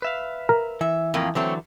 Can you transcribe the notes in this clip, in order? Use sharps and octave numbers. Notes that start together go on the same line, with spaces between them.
B4 E5 F5
A#4
E3 E5
F2 A2 A#3
D3 E3 F#3 A3 C4 C#5